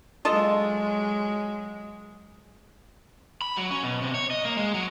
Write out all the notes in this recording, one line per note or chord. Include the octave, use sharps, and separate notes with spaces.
F#3 G#3 F4 A4 D#5
B5
F#3
C#4
B2
C3
C#5
D#5
A#3
G#3
F#3